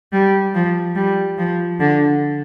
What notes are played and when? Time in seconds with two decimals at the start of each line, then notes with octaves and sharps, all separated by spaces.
0.12 G3
0.54 F3
0.95 G3
1.38 F3
1.79 D3